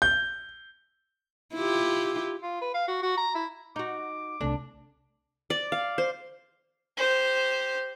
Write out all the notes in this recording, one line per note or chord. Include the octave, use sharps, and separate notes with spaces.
G6
E4 F4 G4
F4
B4
F5
F#4
F#4
A#5
E4
D#4 F#4 D6
C2 C3 A3 D4
D5
F5
C5
G4 C5